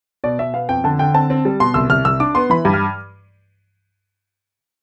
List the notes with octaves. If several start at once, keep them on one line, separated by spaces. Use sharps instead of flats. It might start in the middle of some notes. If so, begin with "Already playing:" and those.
B2 D5
B2 E5
B3 F5
F2 G5
D3 A5
D3 G5
C4 A5
C4
G3
B2 C6
C2 E6
C2 F6
C2 E6
D4 D6
B3 C6
E3 B5
G2
F6